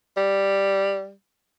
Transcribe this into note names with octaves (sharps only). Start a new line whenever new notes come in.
G3